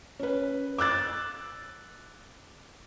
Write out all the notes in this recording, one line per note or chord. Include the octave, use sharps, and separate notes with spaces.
C#4 B4
D6 E6 F#6 A6